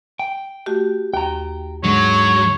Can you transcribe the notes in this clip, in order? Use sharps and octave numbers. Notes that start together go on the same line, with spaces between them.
G5
A3 F#4 G4
D#2 G5 A#5
G#2 D3 F#3 G#3 C#5